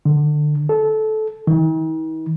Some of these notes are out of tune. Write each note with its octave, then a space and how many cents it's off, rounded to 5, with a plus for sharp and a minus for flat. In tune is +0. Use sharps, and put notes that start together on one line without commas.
D3 +25
A4 -20
D#3 +45